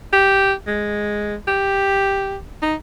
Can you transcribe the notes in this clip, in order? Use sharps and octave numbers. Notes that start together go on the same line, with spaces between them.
G4
G#3
G4
D#4